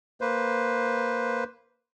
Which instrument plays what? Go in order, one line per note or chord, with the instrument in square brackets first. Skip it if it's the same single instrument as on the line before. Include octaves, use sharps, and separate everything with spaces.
[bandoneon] A#3 B4 C5